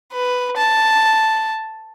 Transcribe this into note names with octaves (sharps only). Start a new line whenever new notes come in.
B4
A5